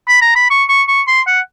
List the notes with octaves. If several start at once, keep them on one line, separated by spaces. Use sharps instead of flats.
B5
A#5
B5
C#6
C#6
C#6
C6
F#5